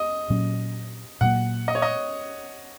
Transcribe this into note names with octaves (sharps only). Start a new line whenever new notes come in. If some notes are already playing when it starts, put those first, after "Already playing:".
Already playing: D#5
A#2 F#3 C#4
A#2 F#3 A#3 F#5
D#5
C#5
D#5